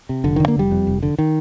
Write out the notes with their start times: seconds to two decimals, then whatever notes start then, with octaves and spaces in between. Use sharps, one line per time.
0.09 C3
0.24 F1 D3
0.36 D3 D#3
0.48 A#3
0.56 F1 G3
0.71 F2
0.87 F1
1.03 D3
1.19 D#3